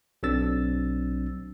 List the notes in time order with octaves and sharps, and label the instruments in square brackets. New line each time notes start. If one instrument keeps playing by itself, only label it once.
[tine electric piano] B1 F#3 C4 D4 E6 A6